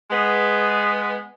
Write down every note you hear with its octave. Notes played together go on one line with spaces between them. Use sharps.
G#3 B3